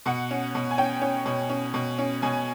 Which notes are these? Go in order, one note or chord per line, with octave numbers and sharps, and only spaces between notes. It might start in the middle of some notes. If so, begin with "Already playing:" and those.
B2 F#5
C#4
B2
G#5
C#4 G5
C#4
B2
C#4
B2
C#4
B2 G#5